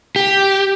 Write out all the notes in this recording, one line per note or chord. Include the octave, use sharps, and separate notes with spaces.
G4